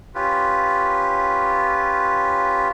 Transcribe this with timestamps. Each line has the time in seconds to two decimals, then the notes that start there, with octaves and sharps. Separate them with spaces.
0.15 C#4 F4 G4 B4